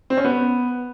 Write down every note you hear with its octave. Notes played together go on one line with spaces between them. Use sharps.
C4
C#4
B3